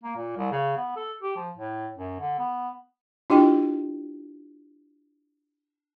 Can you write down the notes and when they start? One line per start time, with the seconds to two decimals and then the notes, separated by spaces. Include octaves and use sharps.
0.04 A#3
0.16 A#2
0.37 C2
0.51 C#3
0.77 B3
0.96 A4
1.22 G4
1.36 F3
1.57 A2
1.98 F#2
2.20 D3
2.39 B3
3.30 D4 E4 F4 G4 D#5 G5